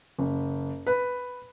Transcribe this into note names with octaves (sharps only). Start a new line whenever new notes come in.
F#1
B4